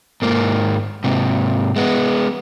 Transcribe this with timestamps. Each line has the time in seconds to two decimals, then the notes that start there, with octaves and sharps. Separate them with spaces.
0.22 G#2 A#3
1.04 G#2 C3
1.76 G#3 B3